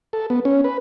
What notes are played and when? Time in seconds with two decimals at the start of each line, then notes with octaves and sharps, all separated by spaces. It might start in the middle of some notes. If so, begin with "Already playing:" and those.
0.13 A4
0.30 B3
0.45 C#4
0.64 B4